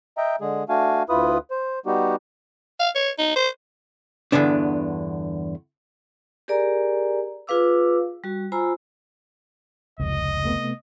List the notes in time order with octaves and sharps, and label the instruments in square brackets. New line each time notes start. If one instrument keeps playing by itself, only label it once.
[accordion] D#5 E5 G5 A#5
D3 G#3 G#4
A3 D4 F#4 F5 G#5
D2 E4 F4 B4 D#6
C5
G3 B3 D#4 F#4 G4
[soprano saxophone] F5
C#5
D#4
C5
[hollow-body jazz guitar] E2 G2 D3 B3 D4
[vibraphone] G4 G#4 A#4 D5 G#5 A#5
F4 G#4 B4 F5 D6 E6
G3 F#4
F4 C5 G#5 A#5 B5 E6
[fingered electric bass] F1 C#2 [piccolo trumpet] D#5
[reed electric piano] C3 A3 B3